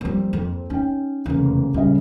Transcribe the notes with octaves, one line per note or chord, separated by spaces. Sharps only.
F3 G3 A#3 C4
F2
C#4 D#4 G5
F1 E2 C#3 A#3
D#1 C#3 G3 D#5